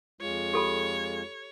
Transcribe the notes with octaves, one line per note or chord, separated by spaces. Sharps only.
F2 G#3 F4 C#5
G4 A4 B5